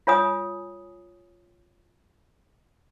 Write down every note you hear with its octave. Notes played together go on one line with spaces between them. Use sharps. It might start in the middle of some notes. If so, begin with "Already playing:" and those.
F4 C#5 G#5 D#6